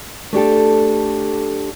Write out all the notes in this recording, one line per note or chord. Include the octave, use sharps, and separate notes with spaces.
A3 D4 G4 A4